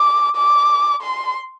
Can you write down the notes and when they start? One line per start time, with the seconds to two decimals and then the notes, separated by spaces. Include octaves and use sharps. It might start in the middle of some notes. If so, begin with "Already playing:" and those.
Already playing: D6
0.36 D6
1.02 C6